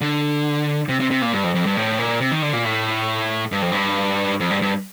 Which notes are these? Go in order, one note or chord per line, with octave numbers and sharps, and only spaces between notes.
D3
C3
C3
C3
A#2
G2
F2
F2
G2
A2
A#2
C3
D#3
D3
A#2
A2
G2
F2
G2
F2
G2
G2